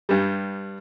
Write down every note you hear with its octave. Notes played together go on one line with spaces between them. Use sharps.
G2 G3